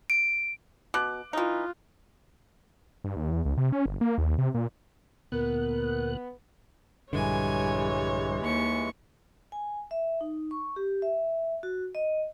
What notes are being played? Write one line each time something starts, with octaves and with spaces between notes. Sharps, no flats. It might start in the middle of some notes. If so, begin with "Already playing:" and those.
D7
B2 D6 F#6
E3 D#4 F4
G2
D#2
E2
C#2
C3
C#4
G1
A#3
D#2
C3
A#2
D2 A#2 B3 A#4 F#6
A#1 G2 D3 E3 G3 G#3 C#5 G#5
D#2 C#6
G#5
E5
D#4
C#6
G4
E5
F#4
D#5